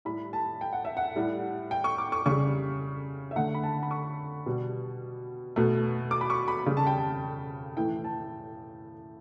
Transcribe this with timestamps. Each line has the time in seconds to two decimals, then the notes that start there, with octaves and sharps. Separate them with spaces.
0.05 A2 G3 B5
0.33 A5
0.61 G5
0.73 F#5
0.85 E5
0.97 F#5
1.16 A2 G3
1.71 G5
1.84 C#6
1.98 D6
2.12 C#6
2.26 C#3 G3 C#6
3.31 E5
3.36 D3 A3 F#5
3.55 B5
3.63 A5
3.83 B5
3.91 C#6
4.46 B2 G3
5.56 B2 A3
6.11 D6
6.21 B5
6.30 C#6
6.48 B5
6.66 C#3 G3 B5
6.77 A5
6.87 G5
6.98 A5
7.77 A2 E3 A3 G5
8.04 A5